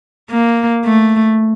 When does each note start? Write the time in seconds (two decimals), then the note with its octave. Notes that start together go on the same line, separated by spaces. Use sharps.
0.31 A#3
0.85 A3